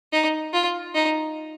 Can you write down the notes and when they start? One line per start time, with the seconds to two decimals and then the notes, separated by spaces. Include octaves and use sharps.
0.13 D#4
0.53 F4
0.94 D#4